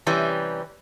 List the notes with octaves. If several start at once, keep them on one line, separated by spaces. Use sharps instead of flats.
C3 E3 G3 C#4